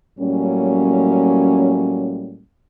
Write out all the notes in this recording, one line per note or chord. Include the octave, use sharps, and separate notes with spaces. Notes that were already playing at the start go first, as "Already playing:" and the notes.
A2 F#3 G3 A#3 C#4